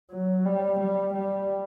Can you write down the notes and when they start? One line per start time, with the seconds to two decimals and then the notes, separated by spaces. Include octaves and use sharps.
0.11 F#3
0.45 G3
0.80 G3
1.14 G3